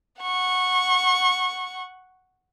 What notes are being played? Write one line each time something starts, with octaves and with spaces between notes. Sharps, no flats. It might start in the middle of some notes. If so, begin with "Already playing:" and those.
F#5 C#6